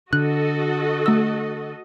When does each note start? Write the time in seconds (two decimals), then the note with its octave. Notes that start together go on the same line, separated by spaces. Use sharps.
0.13 D3 F#4 A4 D#5 F#6
1.06 A3 E6